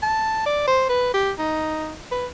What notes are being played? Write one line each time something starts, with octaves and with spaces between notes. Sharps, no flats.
A5
D5
C5
B4
G4
D#4
B4